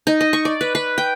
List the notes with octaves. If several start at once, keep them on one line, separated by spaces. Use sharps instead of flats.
D#4
D#5
C#6
D5
B4
B4
G5